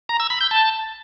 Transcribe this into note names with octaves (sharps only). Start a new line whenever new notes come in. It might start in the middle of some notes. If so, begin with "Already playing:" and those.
A#5
E6
B5
G6
A5